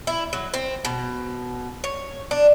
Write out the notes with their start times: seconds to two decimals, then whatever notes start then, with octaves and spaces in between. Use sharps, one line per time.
0.07 E4
0.33 F#3
0.54 C4
0.85 B2
1.84 C#5
2.31 D4